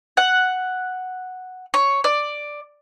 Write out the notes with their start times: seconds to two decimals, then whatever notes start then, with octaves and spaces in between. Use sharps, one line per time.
0.17 F#5
1.74 C#5
2.04 D5